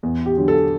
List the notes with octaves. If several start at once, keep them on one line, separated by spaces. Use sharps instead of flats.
E2
G4
D3 F#3
A4